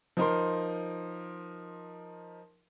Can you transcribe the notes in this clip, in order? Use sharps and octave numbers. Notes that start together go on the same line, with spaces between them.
F3 D#4 A#4 C6